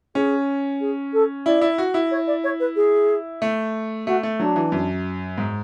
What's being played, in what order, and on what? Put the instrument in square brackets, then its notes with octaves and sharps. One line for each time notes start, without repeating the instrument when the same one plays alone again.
[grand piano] C#4 [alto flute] G#4
[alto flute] G#4
A4
[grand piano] E4 [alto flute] D5
[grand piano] E4
F#4
E4
[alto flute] C#5
D5
C#5
B4
G#4
[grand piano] A3
[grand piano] A3 [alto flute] F#4
[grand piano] A3
[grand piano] F#3 [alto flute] D4
[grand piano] E3
F#2
G#2